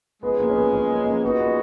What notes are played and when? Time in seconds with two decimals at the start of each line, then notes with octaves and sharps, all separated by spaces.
0.22 C#3 F3 G#3 B3
0.39 A#3
0.49 C#4
0.56 B3
0.73 C#4
0.90 A#3
1.06 A#3
1.23 A#2 G#3 B3 D#4 F#4
1.40 B3